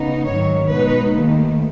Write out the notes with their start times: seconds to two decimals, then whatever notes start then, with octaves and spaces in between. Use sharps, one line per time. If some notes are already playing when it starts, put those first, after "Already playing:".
Already playing: C#3 B3 D#4
0.25 G#2 D#3 F#3 C#5
0.69 B2 G#3 D#4 B4
1.12 D#2 D#3 A3